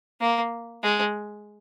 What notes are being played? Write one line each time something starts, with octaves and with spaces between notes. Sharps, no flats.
A#3
G#3